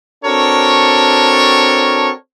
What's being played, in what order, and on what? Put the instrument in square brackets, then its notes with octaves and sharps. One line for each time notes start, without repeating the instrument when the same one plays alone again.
[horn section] C4 D4 F#4 A4 A#4 C#5